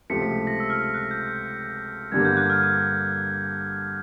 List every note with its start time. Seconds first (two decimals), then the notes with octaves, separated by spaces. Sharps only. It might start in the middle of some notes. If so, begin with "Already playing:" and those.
0.10 C#2 C3 F3 A3 B6 C#7
0.23 B6
0.47 A#6
0.60 E6
0.70 F6
0.77 E6
0.94 F#6
1.11 G6
2.12 G2 D3 G3 A#3 G#6
2.25 G6
2.37 F#6
2.50 F6
2.63 F#6